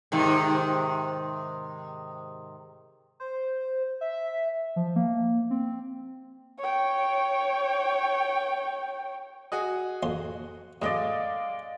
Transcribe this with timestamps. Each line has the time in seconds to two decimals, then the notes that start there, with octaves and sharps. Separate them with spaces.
0.12 G#2 C3 D#3
3.20 C5
4.01 E5
4.76 F3
4.96 A#3
5.50 C4
6.59 C#5 G5
9.52 F#4 G#4 D#5
10.03 A#1 F2 C6
10.82 F#2 A2 G#3 D5 D#5 F5 D#6